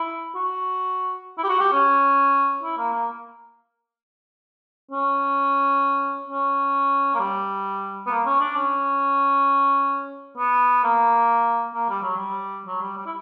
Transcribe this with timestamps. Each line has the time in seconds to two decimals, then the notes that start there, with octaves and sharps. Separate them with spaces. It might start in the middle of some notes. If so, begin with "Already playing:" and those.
Already playing: E4
0.35 F#4
1.38 E4
1.44 G4
1.49 F#4
1.60 G4
1.72 C#4
2.63 E4
2.77 A#3
2.93 A#3
4.91 C#4
6.28 C#4
7.14 A#3
7.19 G3
8.07 B3
8.10 A#3
8.26 C#4
8.40 D4
8.56 C#4
10.37 B3
10.83 A#3
11.74 A#3
11.89 G3
12.03 F#3
12.17 G3
12.66 F#3
12.81 G3
12.97 G3
13.06 E4